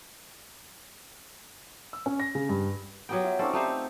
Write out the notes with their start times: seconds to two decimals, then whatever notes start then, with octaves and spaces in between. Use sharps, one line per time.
1.93 E6
2.06 C#4
2.20 A#6
2.35 C#3
2.49 G2
3.09 F#3 B3 G4 G5 A#5 D#6
3.23 F4 E5
3.39 C4 C#4 D#4 A4 D5
3.53 A3 D4 D#4 G4 C5